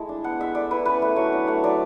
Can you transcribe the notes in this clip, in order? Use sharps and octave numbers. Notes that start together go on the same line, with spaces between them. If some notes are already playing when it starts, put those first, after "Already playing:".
Already playing: G#3 A3 E4
D4
B3 F#5
G#3 E5
A3 D5
E4 B4
C#4 B4
A3
F#3 C#5
D4
A3 F#5
F#3 D5